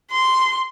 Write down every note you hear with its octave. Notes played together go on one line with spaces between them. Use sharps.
C6